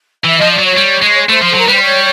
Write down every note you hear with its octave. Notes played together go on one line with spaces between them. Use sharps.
E3 E5
F3 D#5
D5
F#3
C#5
G3
G#3
A3 C5
F3
A4
F#3 A#4
B4
G3
C5
C#5